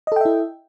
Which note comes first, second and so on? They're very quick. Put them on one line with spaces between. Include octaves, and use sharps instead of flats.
D#5 A4 G5 E5 E4